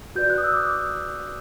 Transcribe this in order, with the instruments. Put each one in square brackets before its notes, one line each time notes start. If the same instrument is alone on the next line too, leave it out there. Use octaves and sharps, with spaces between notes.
[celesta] F#4 B4 D5 G6
F#6
D#6
E6
D6
D#6